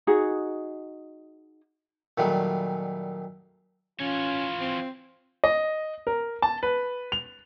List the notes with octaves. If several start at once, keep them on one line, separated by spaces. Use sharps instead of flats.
D#4 F#4 G#4
A#2 D#3 F#3 G3 A3
E3 C#4 F4 C#5
C4
D#5
A#4
A5
B4
F7